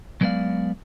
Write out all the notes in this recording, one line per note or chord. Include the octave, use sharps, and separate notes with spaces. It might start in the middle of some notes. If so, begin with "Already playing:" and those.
F#3 G#3 B3 C5 D5 F5